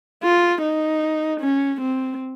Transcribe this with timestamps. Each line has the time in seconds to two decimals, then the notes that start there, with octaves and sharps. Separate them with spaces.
0.23 F4
0.62 D#4
1.40 C#4
1.81 C4